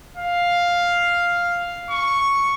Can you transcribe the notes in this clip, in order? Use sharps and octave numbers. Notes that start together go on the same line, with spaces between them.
F5
C#6